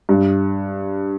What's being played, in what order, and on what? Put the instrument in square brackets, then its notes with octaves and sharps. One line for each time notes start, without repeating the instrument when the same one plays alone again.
[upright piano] G2